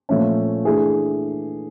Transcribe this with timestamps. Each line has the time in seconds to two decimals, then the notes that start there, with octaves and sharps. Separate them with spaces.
0.09 A#2 F3 A3 C#4
0.65 E3 A3 D4 G#4